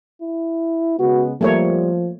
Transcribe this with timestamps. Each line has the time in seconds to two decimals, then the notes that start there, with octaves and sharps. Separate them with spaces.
0.22 E4
0.99 C#3 G#3 B3 F#4
1.41 F3 G3 A3 A#3 C#5